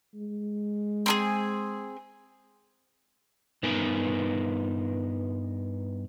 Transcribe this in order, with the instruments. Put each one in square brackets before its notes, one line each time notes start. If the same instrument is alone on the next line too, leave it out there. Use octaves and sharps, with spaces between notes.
[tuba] G#3
[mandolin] C4 D4 G#4
[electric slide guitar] G2 B3 D#4 A#4 G#5